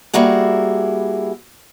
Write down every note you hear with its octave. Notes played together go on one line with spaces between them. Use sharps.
G3 A#3 E4 F#4 G#4